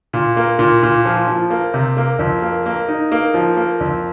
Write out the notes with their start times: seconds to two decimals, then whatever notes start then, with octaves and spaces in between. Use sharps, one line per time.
0.13 A#2
0.37 A#3
0.59 A#2
0.83 A#2
1.05 F3
1.27 F3
1.50 A#3
1.74 C3
1.97 A#3
2.19 F2
2.42 A#3
2.66 A#3
2.88 D#4
3.12 A#3
3.34 F3
3.57 A#3
3.81 F2